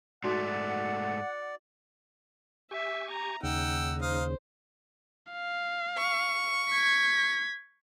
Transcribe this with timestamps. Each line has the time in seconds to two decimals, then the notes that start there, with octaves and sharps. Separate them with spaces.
0.24 G#2 A3 D#4 F#4 D5 F#5
2.71 G4 E5 G#5 C#6
3.10 A#5
3.43 D#2 C#3 D#4 F#5 G5 E6
4.02 D#4 C5 F5 D#6
5.33 F5
5.98 C#6
6.71 G#6 B6